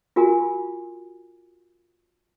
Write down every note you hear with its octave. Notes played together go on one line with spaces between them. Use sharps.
F4 F#4 A#4 G#5